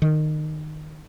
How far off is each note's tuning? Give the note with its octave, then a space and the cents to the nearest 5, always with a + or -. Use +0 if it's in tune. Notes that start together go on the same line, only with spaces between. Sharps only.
D#3 -20